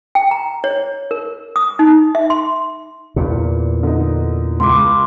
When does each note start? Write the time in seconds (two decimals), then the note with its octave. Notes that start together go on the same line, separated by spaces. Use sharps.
0.15 G5
0.31 A#5
0.64 C#5
1.11 A#4
1.56 D#6
1.79 D#4
2.15 E5
2.30 C6
3.16 E2 A#2
3.83 D3 D#4
4.60 C#2 C6 D6